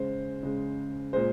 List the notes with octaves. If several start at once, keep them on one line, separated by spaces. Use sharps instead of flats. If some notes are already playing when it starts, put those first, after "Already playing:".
Already playing: C#3 G#3 C5
C#3 G#3
A#2 G#3 C5